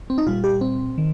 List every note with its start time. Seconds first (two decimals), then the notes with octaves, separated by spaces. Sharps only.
0.10 C4
0.18 D#4
0.26 A#2 G3 F4
0.44 G4
0.61 C4
0.98 D#3